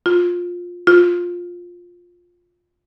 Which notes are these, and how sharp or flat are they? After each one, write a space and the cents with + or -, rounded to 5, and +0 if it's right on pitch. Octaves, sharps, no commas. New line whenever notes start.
F4 +15
F4 +10